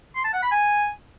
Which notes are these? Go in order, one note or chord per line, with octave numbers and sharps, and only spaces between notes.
C6
A5
F#5
B5
G#5